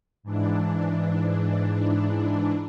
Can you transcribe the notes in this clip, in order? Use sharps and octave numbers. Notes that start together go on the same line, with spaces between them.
G#2 E3 D4